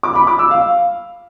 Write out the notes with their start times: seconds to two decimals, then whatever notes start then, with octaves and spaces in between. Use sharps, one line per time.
0.03 D6
0.15 B5
0.27 D6
0.39 E6
0.51 F5